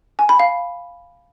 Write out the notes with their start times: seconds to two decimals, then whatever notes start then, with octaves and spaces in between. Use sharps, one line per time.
0.19 G#5
0.29 B5
0.39 F5